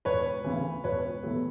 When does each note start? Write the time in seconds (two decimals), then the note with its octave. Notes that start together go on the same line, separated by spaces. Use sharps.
0.05 E1 B4 C#5
0.44 D2 C#3 E3
0.84 E1 B4 C#5
1.23 E2 B2 F#3 A3